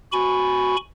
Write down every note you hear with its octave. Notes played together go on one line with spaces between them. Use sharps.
F#4 G#5 B5 C#6